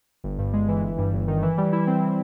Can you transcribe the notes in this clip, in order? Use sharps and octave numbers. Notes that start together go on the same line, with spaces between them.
G1
G2
G#3
E3
G1
G2
G1
D#3
E3
G3
E4
C4